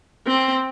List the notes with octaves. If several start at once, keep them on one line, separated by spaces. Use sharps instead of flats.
C4